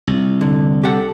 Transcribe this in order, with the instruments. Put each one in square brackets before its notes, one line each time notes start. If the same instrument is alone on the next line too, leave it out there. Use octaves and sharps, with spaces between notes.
[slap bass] C2
[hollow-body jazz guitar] D3
G4 A4 F#5